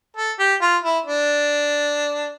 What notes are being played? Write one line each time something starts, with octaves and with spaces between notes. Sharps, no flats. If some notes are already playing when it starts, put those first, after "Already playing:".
A4
G4
F4
E4
D4